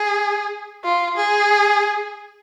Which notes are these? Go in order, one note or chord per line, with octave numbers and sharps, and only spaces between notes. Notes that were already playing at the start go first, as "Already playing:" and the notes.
Already playing: G#4
F4
G#4